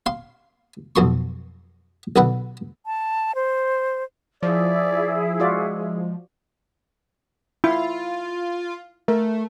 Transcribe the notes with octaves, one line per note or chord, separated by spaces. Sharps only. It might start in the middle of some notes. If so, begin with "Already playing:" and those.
F5 C6
B1 F2 C6 C#6
B1 D3 B4 F#5
A5
C5
F3 E4 G#4 D5
G#3 F4 F#4 D5
E4 F4
A3 A#4